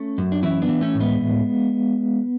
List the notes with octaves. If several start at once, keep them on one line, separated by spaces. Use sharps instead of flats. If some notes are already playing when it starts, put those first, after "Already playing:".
Already playing: A3 C#4
F#2
D4
E3 C#4 E4
B3 D4
E3
A3 C#4
A2
G#3 B3
A2